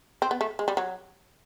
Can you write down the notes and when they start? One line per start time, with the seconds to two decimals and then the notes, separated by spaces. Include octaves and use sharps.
0.22 C4
0.31 B3
0.41 A3
0.59 G#3
0.68 G3
0.77 F#3